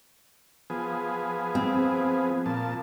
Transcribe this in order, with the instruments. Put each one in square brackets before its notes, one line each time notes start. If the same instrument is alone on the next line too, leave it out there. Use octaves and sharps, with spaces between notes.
[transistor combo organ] F3 B3 G#4
[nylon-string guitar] C4
[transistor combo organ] A#2 F3 A5